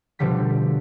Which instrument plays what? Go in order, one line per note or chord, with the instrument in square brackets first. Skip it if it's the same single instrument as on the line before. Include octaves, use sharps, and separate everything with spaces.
[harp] B2 D3 F3 G3 B6